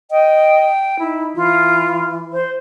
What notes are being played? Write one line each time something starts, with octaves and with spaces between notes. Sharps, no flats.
D#5 G5
D#4 E4
E3 F4
C5